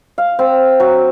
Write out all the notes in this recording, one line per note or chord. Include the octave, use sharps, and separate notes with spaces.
F5
C4
F#3